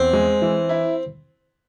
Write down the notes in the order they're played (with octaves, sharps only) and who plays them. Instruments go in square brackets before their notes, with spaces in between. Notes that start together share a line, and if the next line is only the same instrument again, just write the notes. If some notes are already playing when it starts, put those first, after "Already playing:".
Already playing: [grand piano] E2 [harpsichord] C4
[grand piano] G#3
E3
E4